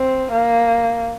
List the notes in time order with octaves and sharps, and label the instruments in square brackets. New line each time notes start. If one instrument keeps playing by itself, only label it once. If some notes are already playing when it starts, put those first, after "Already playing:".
Already playing: [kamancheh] C4
A#3